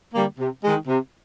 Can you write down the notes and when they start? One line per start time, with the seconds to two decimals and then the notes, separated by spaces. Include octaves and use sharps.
0.14 D3 G3 A#3
0.38 C3
0.63 D#3 G#3
0.87 C3